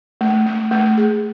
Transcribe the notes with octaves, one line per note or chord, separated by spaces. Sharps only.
A3
A3
A3
G#4